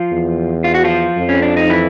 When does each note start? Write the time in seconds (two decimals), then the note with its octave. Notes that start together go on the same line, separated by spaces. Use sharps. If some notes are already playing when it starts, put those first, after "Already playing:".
Already playing: F3 F4
0.11 E2
0.64 F4
0.74 F#4
0.84 F3 F4
1.17 F2
1.29 C#4
1.42 D4
1.57 D#4
1.70 E3 E4